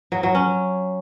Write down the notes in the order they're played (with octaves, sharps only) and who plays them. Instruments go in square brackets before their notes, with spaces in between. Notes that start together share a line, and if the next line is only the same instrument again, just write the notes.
[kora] F#3
F#3
C#4